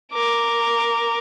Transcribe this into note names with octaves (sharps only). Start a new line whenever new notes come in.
A#4 D6